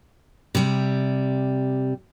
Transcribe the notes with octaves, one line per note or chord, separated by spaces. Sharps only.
C3 G3